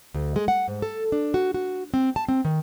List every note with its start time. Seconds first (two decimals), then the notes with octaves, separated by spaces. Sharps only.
0.14 D2
0.36 G#3
0.48 F#5
0.68 G#2
0.82 A4
1.12 D4
1.34 F#4
1.54 F#4
1.94 C4
2.16 A5
2.29 C4
2.45 D#3